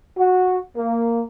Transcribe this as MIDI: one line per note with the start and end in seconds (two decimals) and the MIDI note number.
0.16 0.57 66
0.76 1.21 58